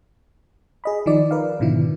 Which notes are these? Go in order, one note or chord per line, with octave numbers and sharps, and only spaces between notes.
G#4 D#5 B5
D#3 F3 D#4 D5
A#4 B4 D5 F5
G#2 B2 D3 D#3 F3 E4